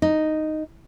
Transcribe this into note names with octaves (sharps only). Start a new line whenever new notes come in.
D#4